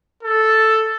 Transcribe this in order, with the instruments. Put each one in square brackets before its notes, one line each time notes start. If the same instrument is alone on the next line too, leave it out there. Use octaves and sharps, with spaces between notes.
[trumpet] A4